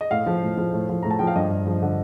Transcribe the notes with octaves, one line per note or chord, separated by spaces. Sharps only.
D#5
A2 F5
F3
A2
F3
A2
F3
A2 A#5
A5
F3 G5
F5
G2 D#5
G2
F3
D3